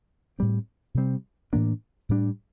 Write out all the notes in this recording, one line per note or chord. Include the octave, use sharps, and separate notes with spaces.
A2 G3 C4
C3 G3 C4
A2 E3 A#3 D4
A2 G3 D4